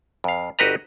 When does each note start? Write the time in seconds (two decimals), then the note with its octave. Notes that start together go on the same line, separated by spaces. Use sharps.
0.24 F2 F5
0.59 G1 F#4 G4 B4 D#5 A#5